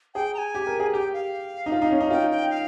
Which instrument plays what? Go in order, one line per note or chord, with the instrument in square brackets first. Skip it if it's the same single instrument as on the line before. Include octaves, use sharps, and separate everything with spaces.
[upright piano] G#4 [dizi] G5
[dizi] A#5
G#5
[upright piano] G4
A#4
G#4
[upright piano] G4 [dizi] G5
[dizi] F5
[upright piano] D#4
F4
D#4
C#4
D#4
[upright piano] F4 [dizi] G5
[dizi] G5
F5